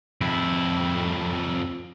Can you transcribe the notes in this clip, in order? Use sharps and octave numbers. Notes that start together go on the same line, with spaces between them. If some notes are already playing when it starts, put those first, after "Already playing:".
F2 E4